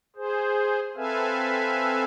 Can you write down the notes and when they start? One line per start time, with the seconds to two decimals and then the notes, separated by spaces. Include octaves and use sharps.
0.16 G#4 C5
0.96 C4 A4 B4 E5 F5 G#5